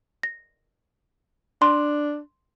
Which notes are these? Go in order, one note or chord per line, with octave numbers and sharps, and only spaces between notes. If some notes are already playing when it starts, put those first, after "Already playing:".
A#6
D4 C6